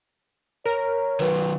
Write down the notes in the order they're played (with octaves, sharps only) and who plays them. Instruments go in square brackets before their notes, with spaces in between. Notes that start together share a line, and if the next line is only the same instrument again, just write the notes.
[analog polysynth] A#4 [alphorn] C#5 [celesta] A#5
[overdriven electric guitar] D#3 F#3 [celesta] B4